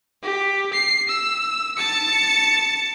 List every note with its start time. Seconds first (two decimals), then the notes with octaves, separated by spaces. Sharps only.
0.23 G4
0.73 C7
1.08 E6
1.77 A5 C#7